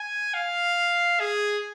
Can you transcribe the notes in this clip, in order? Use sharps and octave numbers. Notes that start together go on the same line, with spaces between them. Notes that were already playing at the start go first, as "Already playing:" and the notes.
Already playing: G#5
F5
G#4